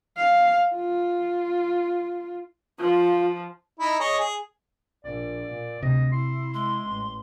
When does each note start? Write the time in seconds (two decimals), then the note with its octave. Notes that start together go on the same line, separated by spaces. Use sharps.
0.17 F5
0.76 F4
2.79 F3 F4
3.80 D#4 E4 B5
4.00 G#4 C#5 D#5
4.20 G#4
5.04 A#1 D5
5.51 A#2
5.83 D2 C3 D#5
6.12 E4 C6
6.54 G#3 C6
6.88 A1